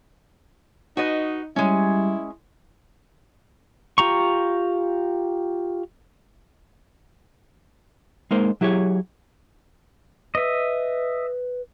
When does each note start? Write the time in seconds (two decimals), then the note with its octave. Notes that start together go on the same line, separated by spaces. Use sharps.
0.97 D#4 F#4 B4 D#5
1.56 G3 G#3 C#4 E4
3.98 F4 G4 A#5 C#6
8.31 G#3 A#3 D#4 A#4 C5
8.61 F#3 E4 G4 G#4 C#5
10.35 B4 D#5 E5